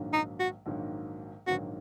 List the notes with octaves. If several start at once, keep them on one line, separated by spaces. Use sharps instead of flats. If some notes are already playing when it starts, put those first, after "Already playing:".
Already playing: A#1 G#2 D#3 F#3 A#3
D#4
F#4
A#1 G#2 D#3 F#3 A#3
A#1 G#2 D#3 F#3 A#3 F#4